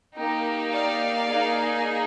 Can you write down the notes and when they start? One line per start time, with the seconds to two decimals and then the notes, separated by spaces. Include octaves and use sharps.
0.17 A#3 D#4 G4
0.73 D5 F5
1.29 A#3 D#4 G#4